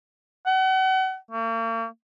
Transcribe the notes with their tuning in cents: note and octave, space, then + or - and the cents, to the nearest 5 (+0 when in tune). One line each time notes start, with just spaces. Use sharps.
F#5 +35
A#3 -45